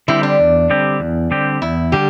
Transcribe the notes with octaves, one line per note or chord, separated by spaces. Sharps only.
D3 G3 C4 E4 G4
D4
E2
D3 G3 C4 G4
E2
D3 G3 C4 G4
E2 E4
D3 G3 G4